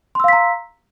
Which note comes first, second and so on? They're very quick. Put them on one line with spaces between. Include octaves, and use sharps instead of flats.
C6 E6 F5 B6 A#5